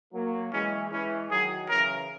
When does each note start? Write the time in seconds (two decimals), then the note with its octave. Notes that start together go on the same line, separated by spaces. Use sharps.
0.13 F#3 A#3
0.53 E3 G#3 C#4
0.91 E3 G#3 C#4
1.31 D#3 F#3 G#4
1.69 C#3 E3 A#4